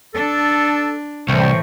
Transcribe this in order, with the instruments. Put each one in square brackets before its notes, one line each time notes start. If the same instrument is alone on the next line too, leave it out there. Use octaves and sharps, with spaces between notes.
[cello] D4 [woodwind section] A4
[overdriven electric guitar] C2 [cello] A2 E3 [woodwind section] C5 G5 C#6